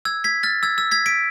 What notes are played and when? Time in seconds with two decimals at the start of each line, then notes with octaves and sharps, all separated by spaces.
0.05 E6 G#6
0.24 G#6 B6
0.43 F6 A6
0.63 E6 G#6
0.78 E6
0.91 G#6 B6
1.06 B6 D7